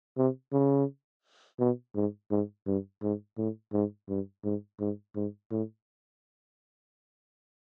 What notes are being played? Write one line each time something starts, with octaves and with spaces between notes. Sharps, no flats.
C3
C#3
B2
G#2
G#2
G2
G#2
A2
G#2
G2
G#2
G#2
G#2
A2